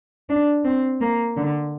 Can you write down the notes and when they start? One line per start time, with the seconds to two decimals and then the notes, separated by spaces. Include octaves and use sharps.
0.29 D4
0.65 C4
1.01 A#3
1.37 D3